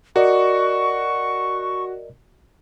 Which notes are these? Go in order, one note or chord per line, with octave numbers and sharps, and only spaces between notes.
F#4 A#4 D5 D#5 C#6